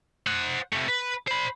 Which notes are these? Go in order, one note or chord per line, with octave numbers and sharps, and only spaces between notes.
C5 F#5
C3 A3
B4
C5 B5